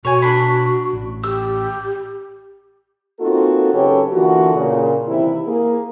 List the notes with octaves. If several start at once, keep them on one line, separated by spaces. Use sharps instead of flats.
B2 F#4 C#5 G#5
D4 B5
A1
G4 E6
A#3 C4 D#4 F4 F#4 A4
F#2 C#3 G4 A4 B4 C#5
D3 E3 A#3 F4 F#4
A#2 C#3
C3 D#3 E3 E4
A#3 G#4